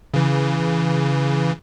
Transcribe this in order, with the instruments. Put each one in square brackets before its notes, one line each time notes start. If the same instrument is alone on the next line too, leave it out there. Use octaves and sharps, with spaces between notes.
[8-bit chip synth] C#3 E3